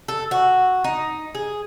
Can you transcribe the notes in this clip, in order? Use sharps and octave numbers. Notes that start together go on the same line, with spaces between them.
A4
F#4
D#4
G#4